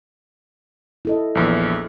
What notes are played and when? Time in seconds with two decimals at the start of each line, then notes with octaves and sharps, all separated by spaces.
1.05 E4 A4 D#5
1.35 A#1 E2